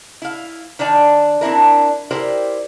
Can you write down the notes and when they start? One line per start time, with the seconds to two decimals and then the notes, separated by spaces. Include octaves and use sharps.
0.22 E4 F5
0.79 D#3 D4 D#4 D5 G#5
1.41 C4 D4 E4 A#4
2.11 E4 G4 A#4 C5 D5